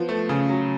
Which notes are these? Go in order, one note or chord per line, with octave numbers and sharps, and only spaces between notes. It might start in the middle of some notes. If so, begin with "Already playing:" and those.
Already playing: F3 B3
A3
C#3
F#3